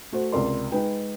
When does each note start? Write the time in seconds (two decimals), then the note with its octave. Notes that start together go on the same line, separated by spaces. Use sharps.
0.12 A3 F#4 C5
0.32 C#2 C3 A#4 D5 C6
0.71 G#3 D#4 B4 G5